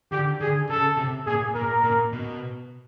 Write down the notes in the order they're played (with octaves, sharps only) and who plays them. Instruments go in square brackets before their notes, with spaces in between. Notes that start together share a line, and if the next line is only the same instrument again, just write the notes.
[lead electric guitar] D3 [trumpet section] G4
[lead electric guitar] D3 [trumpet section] G#4
[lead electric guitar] C#3 [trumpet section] A4
[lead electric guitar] C3
[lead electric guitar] A#2 [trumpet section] G#4
[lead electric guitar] A#2 [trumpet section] A#4
[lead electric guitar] A#2
B2